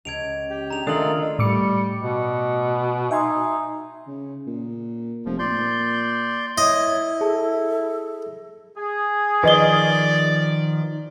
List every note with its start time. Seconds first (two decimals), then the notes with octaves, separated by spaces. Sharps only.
0.05 C#2 G#6 D7 F7
0.50 G4
0.70 D4 G#4 A#5 F7
0.87 D#3 A3 D4 F4 A4 A#4 D#6 F#7
1.39 A2 G3 D6 C#7
2.01 B2
3.11 D#4 E5 G#5 C6
4.08 C#3
4.47 A#2
5.25 F1 F3
5.39 A#2 D5 C6 G6
6.58 E4 C#5 D#5
7.21 G#4 A4 A5
8.77 G#4
9.43 D#3 F3 B4 D5 D#5 G7